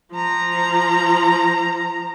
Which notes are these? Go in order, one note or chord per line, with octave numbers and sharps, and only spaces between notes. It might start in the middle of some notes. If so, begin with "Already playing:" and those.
F3 A#5